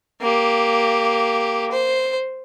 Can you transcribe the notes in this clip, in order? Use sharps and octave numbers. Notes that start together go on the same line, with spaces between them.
A#3 G4
C5